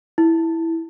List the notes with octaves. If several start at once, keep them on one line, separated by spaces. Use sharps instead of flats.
E4